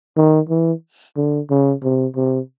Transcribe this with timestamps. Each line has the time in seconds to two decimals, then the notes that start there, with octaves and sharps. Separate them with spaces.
0.17 D#3
0.49 E3
1.17 D3
1.50 C#3
1.83 C3
2.16 C3